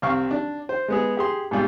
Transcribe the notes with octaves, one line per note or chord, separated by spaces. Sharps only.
C2 C4 F5 C#6
D4
C5
G#3 B3 G#4
G4 G#4 C6
G#2 B2 G3 F4